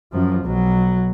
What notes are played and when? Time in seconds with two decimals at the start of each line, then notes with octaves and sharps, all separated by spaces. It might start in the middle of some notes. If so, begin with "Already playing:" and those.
0.12 F#2 F3
0.45 B1 F#3